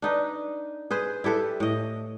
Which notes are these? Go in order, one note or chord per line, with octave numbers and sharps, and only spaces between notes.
D4 D#4 B4
G#4 B4 C5
E4 G4 A4 B4
A2 D#5